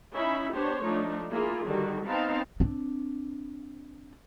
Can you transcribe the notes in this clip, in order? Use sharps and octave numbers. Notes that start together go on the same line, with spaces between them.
C#4 D#4 E4 E5 B5
B3 D4 G4 C5 C#5
F3 A3 D4 D#4
A#3 E4 F4 G#4
D3 D#3 G3 F#4
B3 C4 D#4 F5 G5 A5
C4 D4